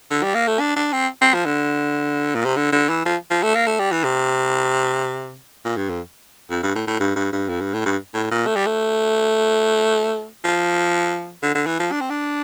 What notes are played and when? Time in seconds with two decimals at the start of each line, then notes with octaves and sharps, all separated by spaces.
0.10 D3
0.23 G3
0.35 A#3
0.47 A3
0.60 D4
0.76 D4
0.93 C4
1.21 C4
1.34 F3
1.46 D3
2.35 A#2
2.45 C3
2.56 D3
2.73 D3
2.89 E3
3.05 F3
3.31 F3
3.43 A3
3.55 A#3
3.67 A3
3.79 G3
3.92 E3
4.04 C3
5.65 A#2
5.77 G2
5.89 F2
6.50 F2
6.63 G2
6.75 A2
6.87 A2
7.00 G2
7.16 G2
7.33 G2
7.49 F2
7.61 G2
7.74 A2
7.85 G2
8.14 A2
8.31 A#2
8.47 A3
8.56 G3
8.66 A3
10.44 F3
11.43 D3
11.55 D3
11.67 E3
11.79 F3
11.92 D4
12.01 C4
12.10 D4